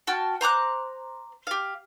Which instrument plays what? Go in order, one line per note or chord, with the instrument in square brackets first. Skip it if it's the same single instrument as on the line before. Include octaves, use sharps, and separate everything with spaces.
[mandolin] F#4 G5 A5 F6
C5 A#5 D6 F#6
G4 F5